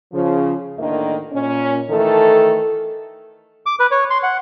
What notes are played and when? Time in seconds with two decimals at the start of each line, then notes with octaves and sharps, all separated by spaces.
0.12 C#3 F3
0.78 D2 A2 D3 D#3 A#3 D#5
1.33 A#2 C#4
1.89 D#3 E3 A3 A4
3.66 D6
3.80 B4
3.91 C#5
4.10 C6
4.23 F#5